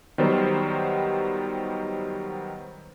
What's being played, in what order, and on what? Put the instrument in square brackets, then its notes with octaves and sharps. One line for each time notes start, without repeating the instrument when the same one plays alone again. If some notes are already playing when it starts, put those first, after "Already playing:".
[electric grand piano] D#3 F#3 G3 B3 C5